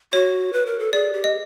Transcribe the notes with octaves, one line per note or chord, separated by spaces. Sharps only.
F#4 C#5
B4
A#4
A4
G#4 D5
G4
D#5